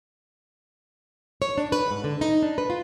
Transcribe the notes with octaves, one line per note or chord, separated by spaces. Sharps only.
C#5
D4
B4
G#2
D3
D#4
D4
B4
F4